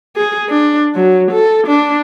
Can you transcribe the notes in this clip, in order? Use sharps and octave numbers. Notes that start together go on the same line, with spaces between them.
G#4
D4
F#3
A4
D4